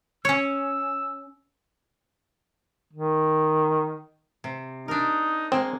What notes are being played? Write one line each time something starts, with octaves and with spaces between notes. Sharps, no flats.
C#4 C#5 E6
D#3
C3
D4 D#4 A#4
G#3 A#3 C4